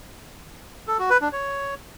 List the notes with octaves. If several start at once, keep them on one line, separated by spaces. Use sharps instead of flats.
A4
F#4
B4
D4
C#5